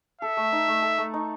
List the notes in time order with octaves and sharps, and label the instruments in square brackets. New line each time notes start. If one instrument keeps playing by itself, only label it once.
[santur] A4 [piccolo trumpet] E5
[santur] A3
D#4
A3
A4
A3
D#4